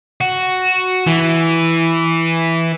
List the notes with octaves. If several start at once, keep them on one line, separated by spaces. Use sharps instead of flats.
F#4
E3